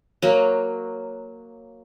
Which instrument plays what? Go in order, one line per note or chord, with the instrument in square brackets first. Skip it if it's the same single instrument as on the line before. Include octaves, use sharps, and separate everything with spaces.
[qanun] F#3 A#3